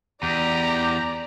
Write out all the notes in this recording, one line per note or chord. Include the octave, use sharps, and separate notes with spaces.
E2 G4 D5 A#5